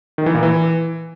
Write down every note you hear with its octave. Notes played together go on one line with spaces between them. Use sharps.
D#3
E3
A#2
E3